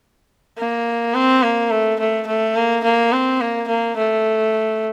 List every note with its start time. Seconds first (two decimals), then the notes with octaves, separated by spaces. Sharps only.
0.58 A#3
1.15 C4
1.43 A#3
1.70 A3
2.00 A3
2.27 A3
2.56 A#3
2.84 A#3
3.12 C4
3.41 A#3
3.68 A#3
3.97 A3